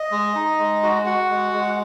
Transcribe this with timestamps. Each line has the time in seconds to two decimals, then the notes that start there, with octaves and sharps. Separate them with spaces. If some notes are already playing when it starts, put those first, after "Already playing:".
Already playing: D#5
0.11 G#3
0.35 D#4
0.59 G#3
0.83 F#4
1.06 F#4 F#5
1.30 G#3
1.53 G#3